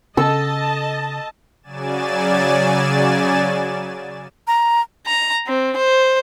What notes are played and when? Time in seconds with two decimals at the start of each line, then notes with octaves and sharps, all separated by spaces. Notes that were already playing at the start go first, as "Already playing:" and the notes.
0.17 C#3 A4 D#5 A5 E6
1.63 C#3 F#3 D5 G#5 A6 E7
4.47 A#5
5.07 A#5
5.47 C4
5.77 C5